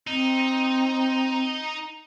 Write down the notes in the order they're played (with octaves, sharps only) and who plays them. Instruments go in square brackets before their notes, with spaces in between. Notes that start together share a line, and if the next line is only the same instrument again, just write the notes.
[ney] C4 [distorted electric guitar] D#4